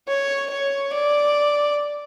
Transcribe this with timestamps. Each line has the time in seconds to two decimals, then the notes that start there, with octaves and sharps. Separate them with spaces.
0.08 C#5
0.50 C#5
0.93 D5